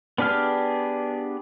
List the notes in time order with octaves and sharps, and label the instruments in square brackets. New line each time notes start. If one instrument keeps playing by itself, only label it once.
[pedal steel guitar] B3 D4 G4 G#4 F6